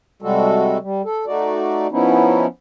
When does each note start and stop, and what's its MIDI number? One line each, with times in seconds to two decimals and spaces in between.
0.22 0.78 48
0.22 0.78 55
0.22 0.78 56
0.22 0.78 66
0.22 0.78 69
0.82 1.02 55
1.05 1.25 69
1.27 1.87 57
1.27 1.87 63
1.27 1.87 66
1.27 1.87 74
1.92 2.46 53
1.92 2.46 59
1.92 2.46 61
1.92 2.46 63
1.92 2.46 64